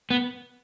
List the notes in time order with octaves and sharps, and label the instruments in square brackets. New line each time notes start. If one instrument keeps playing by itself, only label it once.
[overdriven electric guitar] B3